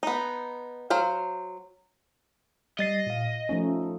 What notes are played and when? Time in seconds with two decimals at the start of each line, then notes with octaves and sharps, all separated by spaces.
0.03 B3 D#4
0.90 F#3 C5 F5
2.79 G3 D#5 A6 C7
3.06 A#2 F5
3.49 F3 A3 C#4 D#4